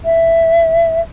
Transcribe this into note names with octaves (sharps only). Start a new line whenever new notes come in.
E5